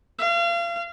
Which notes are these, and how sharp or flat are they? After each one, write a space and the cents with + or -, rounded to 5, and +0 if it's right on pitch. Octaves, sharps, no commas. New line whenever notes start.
F5 -35